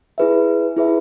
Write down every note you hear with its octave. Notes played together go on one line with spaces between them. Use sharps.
E4 G#4 B4 E5
E4 G#4 B4 E5